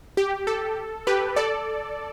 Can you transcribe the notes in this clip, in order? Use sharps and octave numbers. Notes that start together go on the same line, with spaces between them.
G4
A4
G4 B4
A4 D5